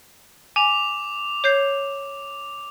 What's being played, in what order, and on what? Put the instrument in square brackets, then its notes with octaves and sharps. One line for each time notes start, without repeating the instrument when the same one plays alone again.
[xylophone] G#5 [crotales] D6 F7
[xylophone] C#5 G6 C7